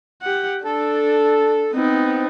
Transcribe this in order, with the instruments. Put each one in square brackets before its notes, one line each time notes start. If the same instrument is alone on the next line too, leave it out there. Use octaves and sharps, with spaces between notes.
[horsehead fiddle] G4 F#5
[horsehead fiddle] D4 [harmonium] A4
[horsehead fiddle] B3 D#4 [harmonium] C4